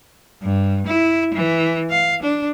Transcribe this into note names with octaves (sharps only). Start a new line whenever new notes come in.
G2
E4
E3
F5
D4